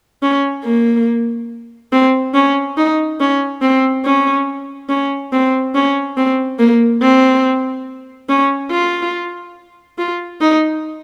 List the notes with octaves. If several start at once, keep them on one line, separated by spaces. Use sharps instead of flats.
C#4
A#3
C4
C#4
D#4
C#4
C4
C#4
C#4
C4
C#4
C4
A#3
C4
C#4
F4
F4
D#4